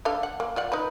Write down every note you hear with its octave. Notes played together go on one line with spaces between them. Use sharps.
D4 A4 F5
F#5
A#3
F4 D5 F#5
D#4 A#4 B4